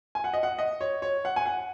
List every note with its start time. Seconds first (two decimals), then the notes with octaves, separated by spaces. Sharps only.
0.15 G#5
0.24 F#5
0.33 D#5
0.43 F#5
0.59 D#5
0.81 C#5
1.02 C#5
1.25 F#5
1.36 G#5
1.46 F#5